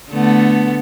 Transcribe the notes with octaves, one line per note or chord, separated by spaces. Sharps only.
D3 A3 B3